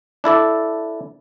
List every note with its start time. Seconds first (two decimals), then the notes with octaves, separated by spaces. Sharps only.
0.24 D4 E4 A4 D5